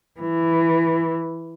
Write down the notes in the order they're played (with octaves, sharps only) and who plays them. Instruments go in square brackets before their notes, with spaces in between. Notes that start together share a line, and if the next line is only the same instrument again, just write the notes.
[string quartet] E3